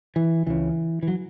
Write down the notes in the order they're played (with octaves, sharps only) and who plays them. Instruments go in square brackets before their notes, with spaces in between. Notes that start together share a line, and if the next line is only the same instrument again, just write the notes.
[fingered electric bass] E3
C#2 C#3 E3
E3
F#3